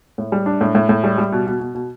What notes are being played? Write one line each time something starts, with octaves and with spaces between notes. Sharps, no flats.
A2
G3
D4
A2
A2
A2
G3
G3
B2
B2
B2
B2